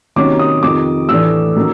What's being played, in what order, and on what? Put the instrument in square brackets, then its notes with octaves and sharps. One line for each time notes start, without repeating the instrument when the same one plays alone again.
[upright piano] C3 D#3 F#3 A#3 C#4 D6
D#6
F2 C3 D#3 D6
A2 E3 A3 D4 E6
D#3 F#3 A#3 C#4